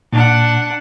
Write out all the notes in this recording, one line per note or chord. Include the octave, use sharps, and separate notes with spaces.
A#2 D4 F#5